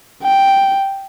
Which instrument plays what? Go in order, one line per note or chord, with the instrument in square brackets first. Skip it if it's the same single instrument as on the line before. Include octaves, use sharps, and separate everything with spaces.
[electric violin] G5